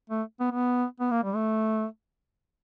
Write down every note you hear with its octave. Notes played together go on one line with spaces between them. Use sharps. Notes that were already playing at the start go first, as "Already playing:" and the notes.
A3
B3
B3
B3
A#3
G3
A3